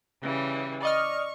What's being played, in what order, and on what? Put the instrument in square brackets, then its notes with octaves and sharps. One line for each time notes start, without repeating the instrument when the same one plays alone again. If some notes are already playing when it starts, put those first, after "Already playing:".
[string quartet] C#3 E3 G3
[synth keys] D5 D#5 F6 [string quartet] C#6